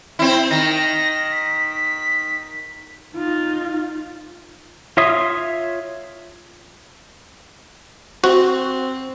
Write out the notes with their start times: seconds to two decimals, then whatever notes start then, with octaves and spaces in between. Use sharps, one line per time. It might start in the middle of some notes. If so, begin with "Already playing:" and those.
0.19 C4 E4
0.50 D#3 A#6
1.31 B6
3.15 D#4 F4
4.97 F4 C#5 E5 C6 D#6
8.24 C4 F#4